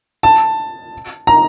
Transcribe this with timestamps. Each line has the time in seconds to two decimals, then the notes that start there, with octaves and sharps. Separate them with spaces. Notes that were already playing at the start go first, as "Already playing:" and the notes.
0.23 A5
1.27 A#5